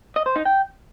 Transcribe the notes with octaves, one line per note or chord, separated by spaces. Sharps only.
D#5
C5
D#4
G5